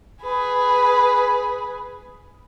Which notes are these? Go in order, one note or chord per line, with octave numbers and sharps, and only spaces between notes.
G#4 B4